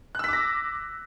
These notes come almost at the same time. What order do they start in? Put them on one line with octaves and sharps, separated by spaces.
F#6 E6 B6 D6 A#6